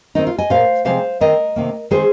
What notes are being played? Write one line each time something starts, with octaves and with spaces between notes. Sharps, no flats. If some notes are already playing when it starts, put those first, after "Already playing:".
D#3 C4 D#4
F4
D#5 G#5
A#2 A#3 C5 F5
C3 F3 G#3 C4 C5 F5
D#3 C4 A#4 D#5
C3 D#3 A#3
D#3 G#3 C4 G#4 C5